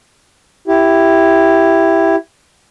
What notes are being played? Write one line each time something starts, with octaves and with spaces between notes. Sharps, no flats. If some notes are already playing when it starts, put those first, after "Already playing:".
E4 G4